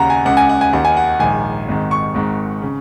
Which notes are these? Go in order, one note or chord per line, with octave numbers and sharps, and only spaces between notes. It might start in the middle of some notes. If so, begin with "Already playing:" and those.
Already playing: D#2 C#3 F#5 A#5
G#5
C#2 C#3 F#5
G#5
F#5
G#5
D#2 D#3 F#5
G#5
F#5
A#1 G#2 D#3 G#5
G#1 G#2 D#3
C#6
G#1 G#2 D#3
C#3